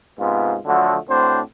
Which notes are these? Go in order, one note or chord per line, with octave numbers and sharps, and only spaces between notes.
G#2 C3 B3 F4
D3 F3 F#3 A3 F#4
A2 C4 D4 F#4 C5